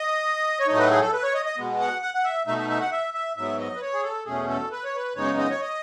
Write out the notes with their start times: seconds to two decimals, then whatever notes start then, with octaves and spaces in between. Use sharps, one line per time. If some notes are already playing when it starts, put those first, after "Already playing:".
Already playing: D#5
0.60 C#5
0.67 A2 F#3 A3 D#4 D#5
0.78 B4
0.90 G#4
1.01 A4
1.13 B4
1.23 C#5
1.34 D#5
1.46 D#5
1.58 B2 G#3 B3
1.80 F#5
2.02 F#5
2.14 F#5
2.24 E5
2.46 B2 A3 D#4 E5
2.58 E5
2.70 E5
2.80 F#5
2.92 E5
3.14 E5
3.36 G#2 F#3 B3 E5
3.59 D#5
3.76 B4
3.81 C#5
3.93 G#4
4.03 A4
4.26 E2 B2 A3 C#4 G#4
4.49 A4
4.72 B4
4.84 C#5
4.96 B4
5.15 F#2 C#3 G#3 B3 D#4 C#5
5.38 D#5
5.50 C#5
5.61 D#5